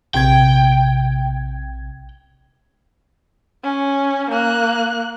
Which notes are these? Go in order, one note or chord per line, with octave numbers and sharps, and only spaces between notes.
A#1 C3 G5 G#6
C#4
A#3 F#6